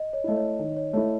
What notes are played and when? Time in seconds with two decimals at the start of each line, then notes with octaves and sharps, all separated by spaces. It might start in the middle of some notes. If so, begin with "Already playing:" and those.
Already playing: D#5
0.13 C#5
0.24 A3 E4 D#5
0.37 C#5
0.59 D#3
0.77 C#5
0.93 A3 E4 C#5